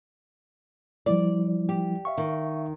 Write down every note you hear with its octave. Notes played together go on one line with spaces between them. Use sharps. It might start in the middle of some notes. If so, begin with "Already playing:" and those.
F3 G3 E4 D5
G4
E5 F5 C#6
D#3